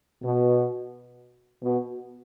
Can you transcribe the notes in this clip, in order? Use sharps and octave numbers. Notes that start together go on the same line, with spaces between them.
B2
B2